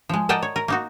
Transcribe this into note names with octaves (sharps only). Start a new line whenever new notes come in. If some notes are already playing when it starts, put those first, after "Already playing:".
F3 G#3
A#4 D5 D#5 F#5 G5 A5
C#5
A#4
A#3 D#4 F#4